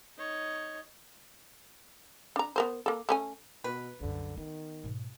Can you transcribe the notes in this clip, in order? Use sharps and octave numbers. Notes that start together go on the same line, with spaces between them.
D#4 C#5
D4 A#5
B3 A#4 C5
A#3 A4
A3 C#4 G#5
B2 B4
C2 F#2 D3
D#3 B3
G#2 B2